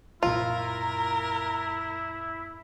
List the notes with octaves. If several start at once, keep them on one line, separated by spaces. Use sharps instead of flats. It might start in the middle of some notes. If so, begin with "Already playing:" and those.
F#2 A#2 E4 F4 A#4